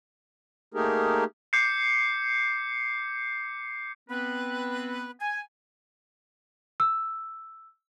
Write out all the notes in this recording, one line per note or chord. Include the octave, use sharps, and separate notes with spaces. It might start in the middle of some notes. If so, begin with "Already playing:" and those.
A3 A#3 D#4 G4 G#4 A#4
D6 G6 C7 C#7
B3 C4 B4
G#5
E6